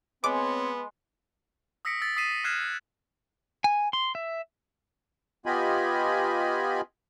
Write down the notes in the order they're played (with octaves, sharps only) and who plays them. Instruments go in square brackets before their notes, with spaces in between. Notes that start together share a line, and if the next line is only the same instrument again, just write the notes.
[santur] G#3 [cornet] B3 [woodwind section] C4 C#5 [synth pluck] D6
[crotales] D#6 E6 A#6 B6 C#7 D7
E6 A6 B6
D#6 B6 C7 D#7 E7
D#6 F6 F#6 G#6 C7 E7
[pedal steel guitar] G#5
C6
E5
[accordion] B3 F4 G4 D#5 G#5 B5